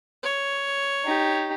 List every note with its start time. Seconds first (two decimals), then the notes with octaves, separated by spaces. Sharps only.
0.24 C#5
1.04 D#4 G4